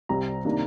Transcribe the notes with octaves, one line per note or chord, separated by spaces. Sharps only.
C2 C3 G3 C4 A#5
C3 D#3 A#3 D4